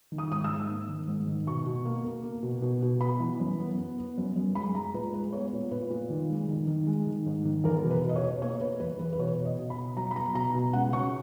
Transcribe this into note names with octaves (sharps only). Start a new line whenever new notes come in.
D#3
D#6
G#2 D#6
E6
G#2
A#3
D#3
G#2
D#3
B2 C#6
B2
A#3
A#3
A#3
B2
B2
B2
B3 B5
E3
F#2
B3
B3
B3
F#2
F#2
G#3 B5
G#3 A#5
A#2 B4
G#3 B4
B3 C#5
A#2
A#2 B4
A#2
D#3
G#3
D#3
D#3
G#3
D#3
G#2
D#3
E2 A#4
B2
B4
B2
D#5
C#5
B2
A#3 C#5
A#3 B4
E2 B4
E2 B4
B4
B2 C#5
B2
D#5
B2
B5
B2
F#3 A#5
B5
B3 A#5
B2 A#5
B2
C#2 F#5
C#3 C#6